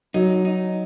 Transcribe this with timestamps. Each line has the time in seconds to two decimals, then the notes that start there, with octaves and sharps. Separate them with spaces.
0.14 F#3 D#4
0.45 D#4